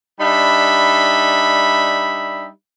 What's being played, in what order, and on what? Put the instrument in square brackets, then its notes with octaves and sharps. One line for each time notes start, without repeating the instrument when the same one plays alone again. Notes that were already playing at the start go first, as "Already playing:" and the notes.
[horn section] G3 D4 D#4 E5 B5